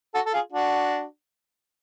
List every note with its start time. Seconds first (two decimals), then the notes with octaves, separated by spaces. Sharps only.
0.14 F#4 A4
0.26 A4
0.33 F4 G#4
0.52 D4 F#4